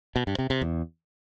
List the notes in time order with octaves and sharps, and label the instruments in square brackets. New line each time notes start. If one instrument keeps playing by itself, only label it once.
[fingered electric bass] B2
G2
C3
C3
E2